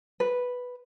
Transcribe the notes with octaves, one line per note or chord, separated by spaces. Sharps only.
B4